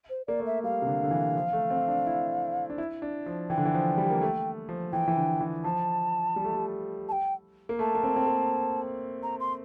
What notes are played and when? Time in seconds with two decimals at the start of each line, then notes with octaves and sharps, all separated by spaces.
0.10 C5
0.27 A#3 D5
0.40 A3
0.46 E5
0.64 G3 F5
0.82 C3
0.87 D3
1.03 D3
1.11 E3
1.36 F3
1.53 A3
1.70 C4
1.88 D4
2.07 E4
2.70 D4
2.78 E4
3.02 D4
3.26 F3
3.50 E3 G5
3.58 D3
3.65 E3
3.74 F3
3.98 G3
4.10 A#3
4.21 A3
4.69 F3
4.92 E3 G5
5.08 E3
5.17 D3
5.41 E3
5.64 F3 A5
6.36 G3
6.44 A3
6.52 G3
7.08 A5
7.12 G5
7.69 A#3
7.79 A3 A5
7.95 A#3
8.03 C4
8.16 C4
8.27 A#3
9.23 A#5
9.40 C6